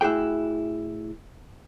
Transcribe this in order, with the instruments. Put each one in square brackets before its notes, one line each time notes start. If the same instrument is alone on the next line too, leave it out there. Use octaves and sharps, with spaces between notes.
[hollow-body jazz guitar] A2 E4 F#4 G#4 G5